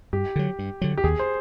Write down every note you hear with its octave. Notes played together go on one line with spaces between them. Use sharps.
G2 G4
D3 F#3
G2
D3 F#3
G4
D#2 G#4
C5